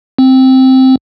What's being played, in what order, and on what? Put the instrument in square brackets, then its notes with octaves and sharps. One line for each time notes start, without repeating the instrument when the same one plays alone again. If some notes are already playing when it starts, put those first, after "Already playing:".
[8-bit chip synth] C4